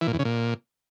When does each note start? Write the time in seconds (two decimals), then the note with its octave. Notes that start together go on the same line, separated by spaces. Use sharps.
0.01 E3
0.07 A#2
0.13 E2
0.19 C#3
0.25 A#2